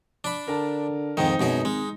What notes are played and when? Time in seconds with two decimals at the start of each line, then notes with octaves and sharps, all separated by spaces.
0.24 D4 B5
0.48 D3 A#4 A5
1.17 F2 G#2 D#3 D#4
1.40 G#1 F#2 B2 G#4
1.65 G#1 G#3